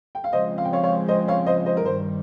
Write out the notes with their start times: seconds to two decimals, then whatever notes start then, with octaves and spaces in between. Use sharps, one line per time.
0.15 G5
0.24 F5
0.33 C#3 F3 G#3 C4 C5 D#5
0.58 F5
0.65 G5
0.73 C#5 F5
0.83 C#5 F5
1.08 C5 D#5
1.28 C#5 F5
1.46 C5 D#5
1.66 C5 D#5
1.77 A#4
1.85 G2 D#3 G3 C5